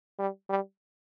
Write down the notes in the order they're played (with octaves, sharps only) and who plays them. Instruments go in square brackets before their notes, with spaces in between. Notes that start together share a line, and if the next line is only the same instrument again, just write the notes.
[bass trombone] G3
G3